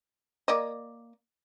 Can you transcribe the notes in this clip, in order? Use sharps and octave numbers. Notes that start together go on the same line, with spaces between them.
A#3 D5 D#5